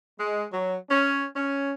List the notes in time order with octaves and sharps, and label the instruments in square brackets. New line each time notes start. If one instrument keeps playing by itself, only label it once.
[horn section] G#3
F#3
C#4
C#4